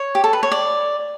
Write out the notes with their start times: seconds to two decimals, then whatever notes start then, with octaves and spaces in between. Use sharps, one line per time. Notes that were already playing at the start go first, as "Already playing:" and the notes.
Already playing: C#5
0.15 G4
0.24 A4
0.33 B4
0.43 C#5
0.52 D5